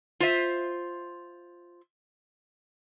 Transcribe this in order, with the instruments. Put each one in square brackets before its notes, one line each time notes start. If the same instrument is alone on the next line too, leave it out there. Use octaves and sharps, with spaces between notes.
[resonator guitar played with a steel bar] F4 C5 E5